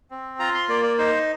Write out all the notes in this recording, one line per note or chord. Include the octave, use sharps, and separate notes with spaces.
C4
F4 A#5
C6
A#3 D5
D5
D#4 C5